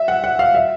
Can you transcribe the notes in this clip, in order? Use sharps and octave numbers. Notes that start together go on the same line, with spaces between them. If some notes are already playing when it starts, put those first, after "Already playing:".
Already playing: E5
F#5
F#5
F5
E5